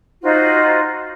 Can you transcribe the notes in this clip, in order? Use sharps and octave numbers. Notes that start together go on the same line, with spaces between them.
D#4 F4 F#4 C5